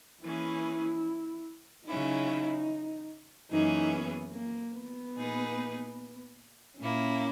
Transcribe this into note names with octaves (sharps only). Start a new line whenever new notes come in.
E3 A#3 C#4 E4 G#4 B4
C#3 F#3 C#4 D#4 E4
F#2 E3 A#3 C#4 D#4 G#4
B3
A#3
B3
A#2 A#3 D#4 G#4 B4
A#2 A#3 C#4 E4